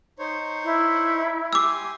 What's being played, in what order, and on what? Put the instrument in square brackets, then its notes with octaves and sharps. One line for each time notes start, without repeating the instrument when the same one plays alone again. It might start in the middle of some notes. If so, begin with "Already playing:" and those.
[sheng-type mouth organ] D#4 C5 C#5
[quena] E4
[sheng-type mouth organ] G4 G#5 C6 [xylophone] D6 E6